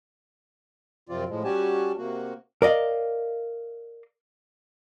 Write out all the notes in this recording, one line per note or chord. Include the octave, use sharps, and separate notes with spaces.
F#2 C3 F3 C4 F4 D5
A2 F3 G#3
G3 C#4 F#4 G4 G#5 A5
C3 A#3 F#4
A#4 D5 D#5 F5